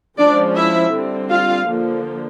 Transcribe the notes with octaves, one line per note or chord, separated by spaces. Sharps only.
F3 G#3 C#4 D4 D5
E4 E5
D3 G3 C4
F4 F5
D3 F3 A#3